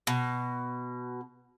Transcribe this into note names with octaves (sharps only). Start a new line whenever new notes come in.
B2